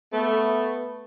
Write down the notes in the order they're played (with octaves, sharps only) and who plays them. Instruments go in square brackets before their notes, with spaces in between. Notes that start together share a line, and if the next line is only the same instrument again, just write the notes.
[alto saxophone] A3 [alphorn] B3